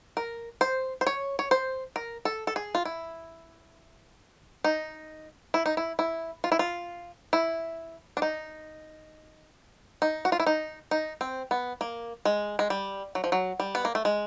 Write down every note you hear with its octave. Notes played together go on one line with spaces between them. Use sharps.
A#4
C5
C5
C#5
C#5
C5
A#4
A4
A4
G#4
F4
E4
D#4
E4
D#4
E4
E4
F4
E4
F4
E4
D4
D#4
D#4
F#4
F4
E4
D#4
D#4
C4
B3
A#3
G#3
G#3
G3
F#3
F3
F#3
G3
B3
A#3
A3
G#3